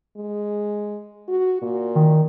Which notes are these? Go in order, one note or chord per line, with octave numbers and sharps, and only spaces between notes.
G#3
F#4
A#2
D#3